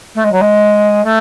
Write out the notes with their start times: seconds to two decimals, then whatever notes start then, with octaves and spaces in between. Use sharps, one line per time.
0.15 A3
0.24 G#3
0.32 F#3
0.41 G#3
1.04 A3